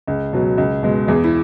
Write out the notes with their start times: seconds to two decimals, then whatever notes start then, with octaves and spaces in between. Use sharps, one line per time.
0.08 C#2
0.33 B2 F#3
0.58 C#2
0.83 B2 G#3
1.08 E2 G#4
1.24 E4